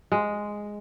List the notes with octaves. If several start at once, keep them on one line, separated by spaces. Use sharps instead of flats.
G#3